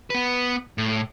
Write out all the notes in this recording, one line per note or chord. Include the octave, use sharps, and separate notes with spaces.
B3 B4
A2